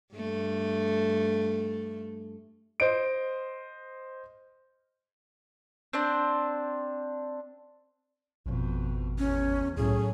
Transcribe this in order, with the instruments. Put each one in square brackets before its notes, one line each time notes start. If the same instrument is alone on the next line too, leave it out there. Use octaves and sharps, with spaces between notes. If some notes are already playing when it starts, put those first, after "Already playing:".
[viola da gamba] G2 A3
[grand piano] C5 D#5 D7
[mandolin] C4 D4 C5
[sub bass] G#1 [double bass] F2 B2
[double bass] E2 [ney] C#4
[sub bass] C2 [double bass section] A2 A3 [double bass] F#3 C#4 [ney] G#4